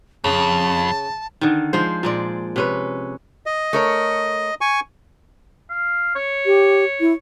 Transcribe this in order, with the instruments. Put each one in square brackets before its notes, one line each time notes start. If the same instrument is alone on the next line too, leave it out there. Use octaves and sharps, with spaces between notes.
[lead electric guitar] F2 [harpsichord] C#3 [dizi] A5
[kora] D3 D#3
F3 G#3 C5
A#2 G#3 D5
C3 C#4 B4
[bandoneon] D#5
[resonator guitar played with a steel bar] A3 A#4 C#5
[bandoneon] G#5 C#6
[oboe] F5
C#5
[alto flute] G4
E4